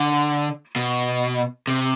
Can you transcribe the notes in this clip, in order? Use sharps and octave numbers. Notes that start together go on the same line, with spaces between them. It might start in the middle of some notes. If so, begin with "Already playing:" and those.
Already playing: D3
B2
C3